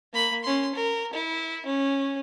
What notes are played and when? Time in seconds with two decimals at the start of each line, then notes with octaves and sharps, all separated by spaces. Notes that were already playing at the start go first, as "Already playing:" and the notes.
0.13 A#3 B5
0.44 C#4 C6
0.75 A#4
1.13 E4
1.66 C#4